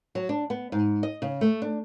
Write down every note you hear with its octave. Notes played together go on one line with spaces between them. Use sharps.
F#3
D4
B3
G#2
D#5
C#3
A3
D4